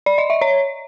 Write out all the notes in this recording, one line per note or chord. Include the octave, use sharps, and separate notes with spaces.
D5
D#5
E5
C#5